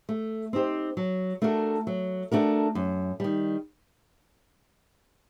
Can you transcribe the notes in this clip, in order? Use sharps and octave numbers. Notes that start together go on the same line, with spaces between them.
A3
C4 D#4 G4 C5
F#3
A3 D4 F#4 A#4
F#3
A3 D4 F#4 A#4
F#2
D#3 G3